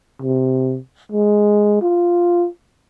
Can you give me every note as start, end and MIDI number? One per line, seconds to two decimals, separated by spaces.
0.21 0.78 48
1.12 1.78 56
1.82 2.47 65